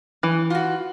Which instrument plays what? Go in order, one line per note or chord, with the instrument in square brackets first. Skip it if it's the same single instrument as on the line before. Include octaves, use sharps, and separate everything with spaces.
[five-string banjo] E3
[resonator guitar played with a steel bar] F4 F#4